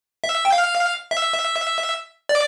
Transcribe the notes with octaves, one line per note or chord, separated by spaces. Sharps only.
E5
G5
F5
E5
D5